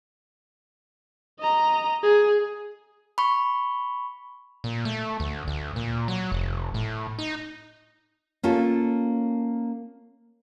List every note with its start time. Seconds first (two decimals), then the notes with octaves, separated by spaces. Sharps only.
1.40 D#5 A#5
2.03 G#4
3.18 B5 C#6
4.64 A#2
4.85 A3
5.20 D2
5.48 D2
5.76 A#2
6.08 F#3
6.32 F1
6.74 A2
7.18 D#4
8.43 A#3 C#4 F4 A4